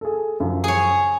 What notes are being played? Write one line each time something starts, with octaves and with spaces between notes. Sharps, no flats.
G#4 A4
F#2 C#3 F3
G#4 C#5